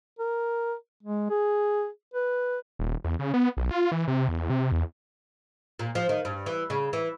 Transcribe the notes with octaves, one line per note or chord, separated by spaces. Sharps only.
A#4
G#3
G#4
B4
D#1
E2
C#3
B3
B1
F4
E3
C3
E2
C3
E2
A#2
F3
D#3
G2
E3
C#3
E3